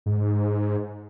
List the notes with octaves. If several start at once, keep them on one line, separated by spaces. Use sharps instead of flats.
G#2